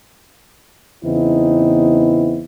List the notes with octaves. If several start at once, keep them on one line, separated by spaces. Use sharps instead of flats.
E2 C#3 B3 C4 D#4 E4